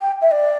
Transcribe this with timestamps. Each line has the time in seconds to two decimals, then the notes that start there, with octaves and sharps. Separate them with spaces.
0.02 G5
0.22 E5
0.31 D5